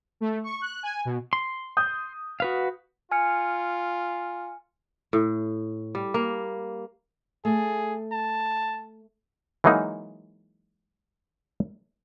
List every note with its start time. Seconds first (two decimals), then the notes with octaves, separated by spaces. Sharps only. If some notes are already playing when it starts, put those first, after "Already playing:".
0.21 A3
0.44 C#6
0.61 F#6
0.83 G#5
1.05 B2
1.33 C6
1.77 D#6 G6
2.40 F#4 B4 F5
3.11 F4 G#5 F6 C#7
5.13 A2
5.95 G3
6.14 A#3
7.45 A3 G#4
8.12 A5
9.64 E3 F#3 G#3 A#3 D#4